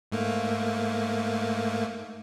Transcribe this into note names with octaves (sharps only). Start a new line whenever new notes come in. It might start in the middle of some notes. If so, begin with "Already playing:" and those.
G#2 A3 A#3